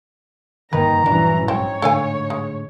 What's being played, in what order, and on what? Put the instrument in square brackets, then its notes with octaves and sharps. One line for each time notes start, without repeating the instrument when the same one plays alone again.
[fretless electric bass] F#1 G2 A#3 [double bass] D#3 [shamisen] B4 [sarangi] A#5
[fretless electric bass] A#1 G2 F#3 [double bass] E3 C#4 [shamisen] D4
[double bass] G#2 [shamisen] C4 E4 [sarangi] C#5
[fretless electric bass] A2 D3 [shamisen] A4 F5 G#5
[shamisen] G#3